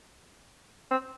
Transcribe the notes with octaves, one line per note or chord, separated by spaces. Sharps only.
C4